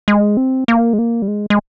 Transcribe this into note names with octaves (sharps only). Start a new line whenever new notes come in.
G#3
C4
A#3
G#3
A#3
G3
G#3
G#3